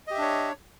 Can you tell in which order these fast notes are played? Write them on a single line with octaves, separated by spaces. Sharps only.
D#5 G4 E5 D4 C#5